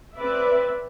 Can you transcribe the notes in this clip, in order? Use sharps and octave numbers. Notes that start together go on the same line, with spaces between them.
C4 B4 D5 E5